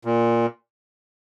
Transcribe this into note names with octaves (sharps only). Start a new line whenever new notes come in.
A#2